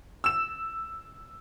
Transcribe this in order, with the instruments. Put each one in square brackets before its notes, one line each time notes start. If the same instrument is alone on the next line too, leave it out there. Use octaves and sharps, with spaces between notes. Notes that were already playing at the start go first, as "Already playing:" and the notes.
[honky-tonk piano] E6 E7